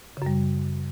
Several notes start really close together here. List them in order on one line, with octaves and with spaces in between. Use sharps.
C#3 F#2 G3